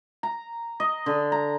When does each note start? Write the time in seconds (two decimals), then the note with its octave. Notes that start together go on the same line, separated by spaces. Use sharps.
0.23 A#5
0.80 D#5
1.06 D3
1.32 A#5